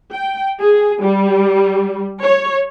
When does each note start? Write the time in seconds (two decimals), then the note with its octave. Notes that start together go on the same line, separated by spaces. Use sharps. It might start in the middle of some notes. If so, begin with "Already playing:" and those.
0.12 G5
0.60 G#4
1.02 G3
2.22 C#5